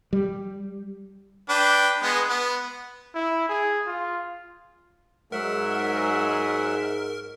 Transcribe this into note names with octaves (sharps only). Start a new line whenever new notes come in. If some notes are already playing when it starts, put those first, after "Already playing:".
G3
D4 B4 G5
G#3 B3
B3
E4
G#4
F4
G#2 F#3 G#3 A#4 E5 F#5